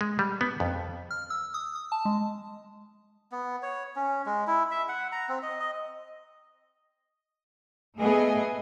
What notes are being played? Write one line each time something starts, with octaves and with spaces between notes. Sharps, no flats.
G#3
G3
B3
F2
F6
E6
D#6
D#6
A5
G#3
B3
C#5
C#4
G#3
E4
E5
F#5
A#5
C4
D#5
D#5
A3 B3 G#4 D#5